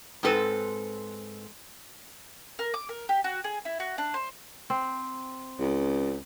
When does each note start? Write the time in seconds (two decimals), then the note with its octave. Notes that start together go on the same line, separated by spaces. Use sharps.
0.23 G#2 C4 A4 B4
2.59 A#4
2.74 D6
2.89 A#4
3.09 G4
3.24 F#4
3.44 G#4
3.65 E4
3.80 F#4
3.98 D4
4.14 C5
4.70 C4
5.59 C#2